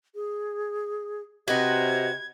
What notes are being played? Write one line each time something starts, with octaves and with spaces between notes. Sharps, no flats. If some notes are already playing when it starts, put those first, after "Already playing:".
G#4
C3 F#4 B4 D#5 G#6